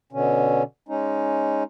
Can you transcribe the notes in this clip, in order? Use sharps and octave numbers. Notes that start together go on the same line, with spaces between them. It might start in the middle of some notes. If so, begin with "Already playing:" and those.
B2 D3 C#4
G#3 C#4 D#4